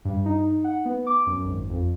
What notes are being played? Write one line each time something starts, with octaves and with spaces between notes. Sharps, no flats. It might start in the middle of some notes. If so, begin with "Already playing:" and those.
G2
D#4
F#5
B3
D6
F#2
G#1
F2